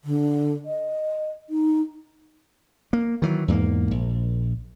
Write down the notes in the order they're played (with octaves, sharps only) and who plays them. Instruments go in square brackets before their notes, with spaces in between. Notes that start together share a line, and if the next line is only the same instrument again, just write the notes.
[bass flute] D3
D#5
D#4
[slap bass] A#3
D#3 E3 F#3
E2 G#2 G3 A#3
A#1